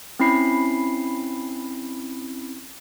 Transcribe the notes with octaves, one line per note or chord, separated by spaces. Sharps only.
C4 C#4 E4 B5 C7